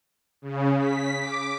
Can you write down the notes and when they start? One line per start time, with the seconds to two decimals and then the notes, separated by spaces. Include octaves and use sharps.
0.42 C#3
0.78 B6
1.19 D6